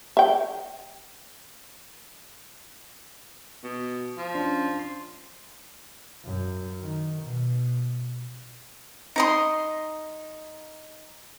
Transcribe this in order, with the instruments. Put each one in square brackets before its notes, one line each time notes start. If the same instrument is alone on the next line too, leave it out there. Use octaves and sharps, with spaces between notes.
[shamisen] E5 G5
[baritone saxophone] B2
F3
[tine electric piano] C#4 D4
C6
[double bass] F#2
D#3
B2
[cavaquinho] D#4 D#5 C6